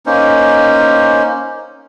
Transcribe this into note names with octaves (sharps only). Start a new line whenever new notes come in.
A#3 C#4 D#4 C5